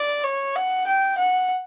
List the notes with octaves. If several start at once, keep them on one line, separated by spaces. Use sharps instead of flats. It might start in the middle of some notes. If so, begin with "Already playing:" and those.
Already playing: D5
C#5
F#5
G5
F#5